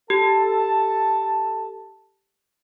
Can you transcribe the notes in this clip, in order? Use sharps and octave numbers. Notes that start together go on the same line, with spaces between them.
G4 A4 A5